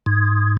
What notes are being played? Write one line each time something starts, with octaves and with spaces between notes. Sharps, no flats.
G#2